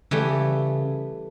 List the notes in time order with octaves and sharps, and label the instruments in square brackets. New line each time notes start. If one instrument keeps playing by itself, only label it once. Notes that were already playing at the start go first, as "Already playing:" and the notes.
[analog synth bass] C#3 [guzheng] E3 G3 A3